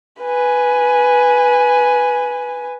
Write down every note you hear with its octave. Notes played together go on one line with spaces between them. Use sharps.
B4 G#5